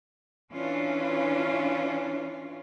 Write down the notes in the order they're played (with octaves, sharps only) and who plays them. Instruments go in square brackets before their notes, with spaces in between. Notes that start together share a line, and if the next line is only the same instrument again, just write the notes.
[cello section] E3 C#4 D4 F4